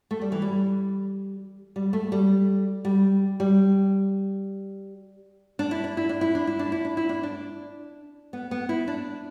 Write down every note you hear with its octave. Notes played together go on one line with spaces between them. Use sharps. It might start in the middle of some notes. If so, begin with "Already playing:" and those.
A3
G3
E3
G3
G3
A3
G3
G3
G3
D4
E4
D4
E4
D4
E4
D4
E4
D4
E4
D4
E4
D4
D4
B3
B3
E4
D4